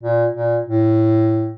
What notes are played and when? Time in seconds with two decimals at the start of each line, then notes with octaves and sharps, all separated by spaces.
0.03 A#2
0.34 A#2
0.66 A2